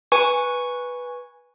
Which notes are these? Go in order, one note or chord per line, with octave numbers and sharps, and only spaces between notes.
B4 G#5 C#6